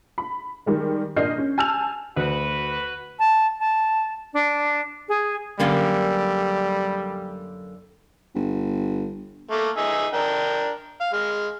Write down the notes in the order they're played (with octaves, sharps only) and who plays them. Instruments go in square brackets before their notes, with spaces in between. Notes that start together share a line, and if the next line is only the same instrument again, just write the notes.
[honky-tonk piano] B5
D#3 G3 G#3
A#2 D4 D#5 F6 G6 C7
C#4
G#5 A5 E6 F6 G6 F7
[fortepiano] D2 [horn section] F#4 B4
[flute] A5
A5
D4
G#4
[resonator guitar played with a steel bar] F#2 D3 A#3 [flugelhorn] G3
[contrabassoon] G1
[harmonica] A3 A#3
D#4 G#4 E5
D4 A#4 G5
F5
G#3 F6